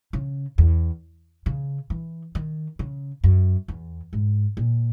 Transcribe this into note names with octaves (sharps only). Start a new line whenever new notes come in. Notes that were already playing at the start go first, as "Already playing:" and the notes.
C#3
E2
C#3
E3
D#3
C#3
F#2
E2
G#2
A#2